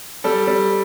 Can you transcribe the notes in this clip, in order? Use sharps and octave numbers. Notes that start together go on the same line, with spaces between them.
G3 A4
G3